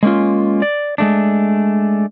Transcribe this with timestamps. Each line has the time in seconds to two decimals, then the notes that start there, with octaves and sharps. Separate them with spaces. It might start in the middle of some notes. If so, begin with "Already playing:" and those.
0.03 G#3 A#3 C#4 F4
0.62 D5
0.98 G#3 A3 D4